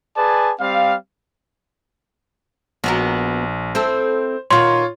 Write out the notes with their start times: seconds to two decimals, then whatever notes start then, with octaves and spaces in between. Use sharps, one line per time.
0.16 G#4 B4 D5 G#5 A5
0.61 G3 C4 F5
2.84 A#1 B3 F#4 A#4
3.75 C4 E4 A4 C5
4.51 A#2 D#3 F4 F#4 C#5 C6